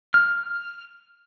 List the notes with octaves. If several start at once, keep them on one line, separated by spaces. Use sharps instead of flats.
F6